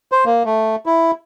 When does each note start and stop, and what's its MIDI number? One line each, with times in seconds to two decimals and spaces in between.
0.12 0.25 72
0.25 0.43 58
0.45 0.76 57
0.86 1.11 64